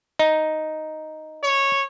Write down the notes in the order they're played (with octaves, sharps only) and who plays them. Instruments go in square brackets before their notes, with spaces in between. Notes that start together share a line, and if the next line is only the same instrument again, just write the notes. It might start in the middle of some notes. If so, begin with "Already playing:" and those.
[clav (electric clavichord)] D#4
[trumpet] C#5